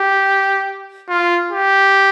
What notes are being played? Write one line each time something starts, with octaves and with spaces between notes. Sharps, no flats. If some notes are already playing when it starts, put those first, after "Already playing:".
Already playing: G4
F4
G4